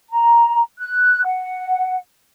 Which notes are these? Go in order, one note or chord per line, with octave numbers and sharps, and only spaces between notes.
A#5
F#6
F#5